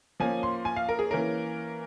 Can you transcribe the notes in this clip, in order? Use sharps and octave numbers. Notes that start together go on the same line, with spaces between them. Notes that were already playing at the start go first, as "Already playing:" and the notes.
F3 A#3 C#4 G#5
C6
G#5
F5
A#4
G#4
E3 A#3 C#4 A#4